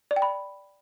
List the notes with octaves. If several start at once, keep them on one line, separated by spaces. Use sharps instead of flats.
D5
G5
B5